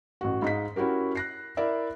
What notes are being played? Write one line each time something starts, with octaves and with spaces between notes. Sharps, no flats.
A1 F#4
G#2 D#5 F5 B6
C#4 E4 F#4 G4 A#4
F#6 A#6 C7
E4 A#4 D5 E5